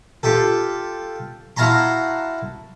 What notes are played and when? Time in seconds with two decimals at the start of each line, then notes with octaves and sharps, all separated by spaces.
0.23 F4 G4 A4
1.57 E4 F#4 F5 A5 A#5 C6